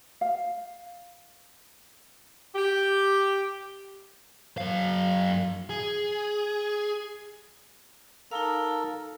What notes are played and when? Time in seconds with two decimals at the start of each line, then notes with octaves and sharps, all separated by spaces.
0.21 F5
2.55 G4
4.58 F#2 F5
5.70 G#4
8.31 D#4 A4 A#4 F5